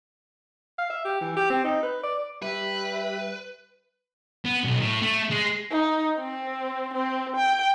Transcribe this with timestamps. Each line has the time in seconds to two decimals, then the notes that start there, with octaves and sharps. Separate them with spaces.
0.78 F5
0.90 E5
1.05 G4
1.21 E3
1.37 G4
1.50 C4
1.65 D#4
1.83 B4
2.03 D5
2.42 G3 G4 B4 E5
4.45 B3
4.64 B1
4.79 A2
5.02 A3
5.31 G#3
5.71 D#4
6.18 C4
6.94 C4
7.36 G5